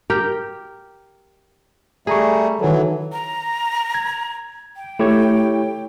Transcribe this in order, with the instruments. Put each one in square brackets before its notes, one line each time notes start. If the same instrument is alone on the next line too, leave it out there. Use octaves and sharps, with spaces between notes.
[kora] G4 A#4 G5
[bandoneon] G3 A3 [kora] G#4 [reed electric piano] G#5 A#5 C#6
[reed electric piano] D#3 A4 [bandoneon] E3 F#3
[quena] A#5
[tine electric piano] G#6
[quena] G5
[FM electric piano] A3 [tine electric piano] E4 G4 C#5